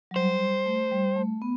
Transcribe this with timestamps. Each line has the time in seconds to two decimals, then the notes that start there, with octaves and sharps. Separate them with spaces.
0.11 F#3
0.16 G3 C5
0.66 A3
0.91 G3
1.16 A3
1.42 B3